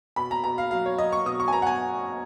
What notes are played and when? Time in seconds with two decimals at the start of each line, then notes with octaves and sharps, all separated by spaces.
0.16 B2 B5
0.31 A#5
0.44 B2 A#5
0.58 F5
0.71 F#3 F5
0.86 C#5
0.98 F#3 D#5
1.12 C#6
1.25 B2 D#6
1.40 C#6
1.48 G#5
1.53 B2 A#5
1.62 F#5
1.67 G#5